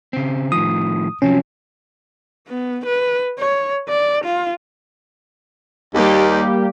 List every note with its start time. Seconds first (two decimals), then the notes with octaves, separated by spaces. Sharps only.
0.13 C#3 C4
0.52 A2 D#3 F3 D#6
1.22 C3 F3 F#3 C#4
2.48 B3
2.86 B4
3.39 C#5
3.88 D5
4.25 F4
5.94 D#2 G3 A#3 G4